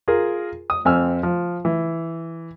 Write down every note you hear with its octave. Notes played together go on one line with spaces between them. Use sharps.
F4 G#4 A#4
D#6
F2 C4 G#5 E6 F6
F3
E3